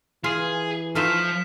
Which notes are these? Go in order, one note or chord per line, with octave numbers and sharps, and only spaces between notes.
E3 F4 G#4
F3 A3 D#4 F4 F6 B6 E7